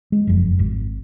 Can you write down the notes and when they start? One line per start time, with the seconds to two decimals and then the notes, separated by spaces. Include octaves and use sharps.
0.12 G#3
0.27 F#1 F2
0.59 G#1